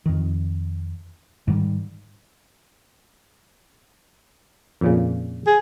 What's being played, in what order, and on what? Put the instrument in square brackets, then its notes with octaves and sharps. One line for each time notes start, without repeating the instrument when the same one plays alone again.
[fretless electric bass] F2 D#3
G#2 D#3 G3
[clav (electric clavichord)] F2 A#2 C#3
[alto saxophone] G#4